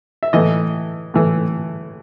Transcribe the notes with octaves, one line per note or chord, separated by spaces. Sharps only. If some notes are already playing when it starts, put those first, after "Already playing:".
E5
A2 E3 D#5
A2 E3